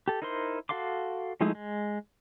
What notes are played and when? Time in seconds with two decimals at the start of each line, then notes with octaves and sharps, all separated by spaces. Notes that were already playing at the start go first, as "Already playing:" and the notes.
0.08 G4 A4
0.22 D#4 E4 A#4 C5 C6
0.69 F#4 A4 F5 C6 D6
1.41 F3 G#3 A3 D#4 E4
1.55 G#3